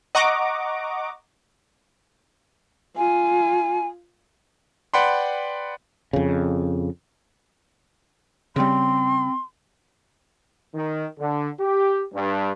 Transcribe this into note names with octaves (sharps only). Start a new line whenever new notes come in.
D#5 F#5 A#5 C#6 D6
F4 G#5
B4 D5 F#5 G5 B5 C6
F2 C#3
C#3 G3 C4 C6
D#3
D3
G4
G2